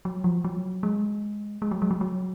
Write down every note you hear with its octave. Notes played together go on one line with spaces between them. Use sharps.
F#3
F3
F#3
G#3
G#3
F#3
G#3
F#3
F#3